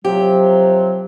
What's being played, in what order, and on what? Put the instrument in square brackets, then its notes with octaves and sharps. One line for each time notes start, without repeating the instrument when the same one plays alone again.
[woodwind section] C3 F3 F#3 [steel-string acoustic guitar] G4